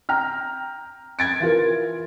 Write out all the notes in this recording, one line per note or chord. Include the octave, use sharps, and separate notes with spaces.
G5 A#5 F6
G#6 A6 D7
E3 F4 A#4